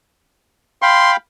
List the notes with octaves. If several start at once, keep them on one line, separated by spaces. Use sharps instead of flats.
F5 G5 B5 C6